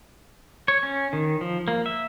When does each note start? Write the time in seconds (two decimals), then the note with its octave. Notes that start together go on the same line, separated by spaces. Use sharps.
0.68 C#5
0.83 C#4
1.13 D#3
1.41 F3
1.68 A#3
1.86 E5